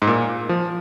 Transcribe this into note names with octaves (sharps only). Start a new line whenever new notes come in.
G#2
A#2
F3